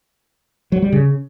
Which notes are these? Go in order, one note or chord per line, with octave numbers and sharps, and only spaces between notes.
F#3
G3
C#3